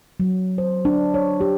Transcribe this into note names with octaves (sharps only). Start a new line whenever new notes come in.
F#3
C5
D4
C#5
G4